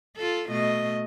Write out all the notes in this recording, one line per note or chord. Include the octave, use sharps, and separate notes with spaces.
F4 A4
B2 A3 D#5